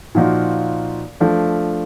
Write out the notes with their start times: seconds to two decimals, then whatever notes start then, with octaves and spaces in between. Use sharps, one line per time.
0.15 A#2 F3 A#3 D#4 F#4
1.20 F3 A3 D4